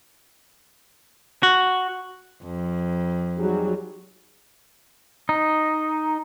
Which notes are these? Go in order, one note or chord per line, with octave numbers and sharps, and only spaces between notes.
F#4
F2
F#3 G3 D#4 F#4 G#4
D#4